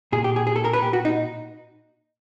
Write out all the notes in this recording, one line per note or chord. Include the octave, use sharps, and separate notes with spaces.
A#2 G#4
G4
G#4
G#4
A4
A#4
B4
G4
F#4
D#4